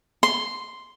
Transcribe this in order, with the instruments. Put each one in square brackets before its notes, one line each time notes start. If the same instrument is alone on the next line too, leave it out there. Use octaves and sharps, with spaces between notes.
[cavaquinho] C6